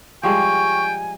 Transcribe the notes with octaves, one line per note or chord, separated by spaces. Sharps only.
F3 G3 G#3 G5 G#5 C#6